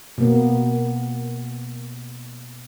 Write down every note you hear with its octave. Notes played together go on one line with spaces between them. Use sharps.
B2 A#3 B3